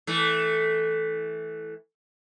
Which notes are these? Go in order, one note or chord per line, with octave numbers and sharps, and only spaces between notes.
E3 A3